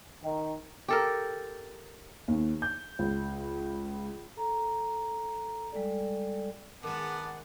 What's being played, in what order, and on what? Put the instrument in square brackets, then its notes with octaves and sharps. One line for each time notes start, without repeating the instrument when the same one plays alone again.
[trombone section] D#3
[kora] G4 A4 A#4
[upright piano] D#2
G6
C#2
[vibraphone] A4 A#5
G3 G#3 A4 D5
[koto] D#3 G#3 [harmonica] B3 A5 [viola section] G#4 F#5 [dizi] D6